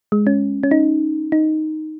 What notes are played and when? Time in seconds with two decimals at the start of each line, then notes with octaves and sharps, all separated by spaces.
0.12 G#3
0.27 C#4
0.63 C#4
0.71 D#4
1.32 D#4